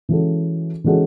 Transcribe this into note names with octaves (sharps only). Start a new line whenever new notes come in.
E3 G#3 C#4 F#4 A4
E3 G#3 C#4 F#4 A4